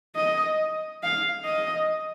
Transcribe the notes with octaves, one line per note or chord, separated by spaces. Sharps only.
D#5
F5
D#5